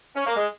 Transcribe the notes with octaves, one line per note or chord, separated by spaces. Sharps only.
C#4
A#3
G#3